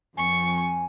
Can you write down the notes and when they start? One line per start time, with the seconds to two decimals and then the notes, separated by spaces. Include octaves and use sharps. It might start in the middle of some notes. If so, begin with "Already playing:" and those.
0.17 F2 G#5 C#6